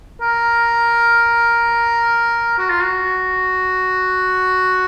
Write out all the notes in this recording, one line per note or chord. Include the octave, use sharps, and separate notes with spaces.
A#4
F#4
F4
F#4